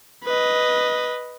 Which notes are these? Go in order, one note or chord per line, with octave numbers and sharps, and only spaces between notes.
B4 D#5